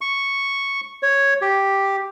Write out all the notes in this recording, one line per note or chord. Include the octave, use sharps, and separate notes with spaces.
C#6
C#5
G4